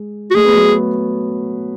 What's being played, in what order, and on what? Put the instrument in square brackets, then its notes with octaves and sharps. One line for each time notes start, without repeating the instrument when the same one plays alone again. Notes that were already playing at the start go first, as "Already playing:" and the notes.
Already playing: [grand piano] G#3
[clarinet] F#4
[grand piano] A3 [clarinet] G#4
[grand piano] B3
F#3 A3